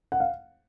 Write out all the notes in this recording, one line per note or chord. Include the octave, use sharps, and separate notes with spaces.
F#5
F5